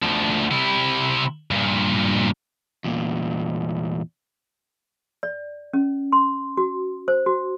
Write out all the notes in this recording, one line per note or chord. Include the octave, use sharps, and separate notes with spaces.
D2 F3
C3 E4
G2 A#2
E2 A#2
D5
C#4
C6
F#4
C5
F#4